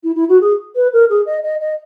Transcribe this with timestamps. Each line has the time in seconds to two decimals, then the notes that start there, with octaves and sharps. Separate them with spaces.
0.03 E4
0.15 E4
0.29 F#4
0.41 G#4
0.76 B4
0.93 A#4
1.10 G#4
1.26 D#5
1.43 D#5
1.60 D#5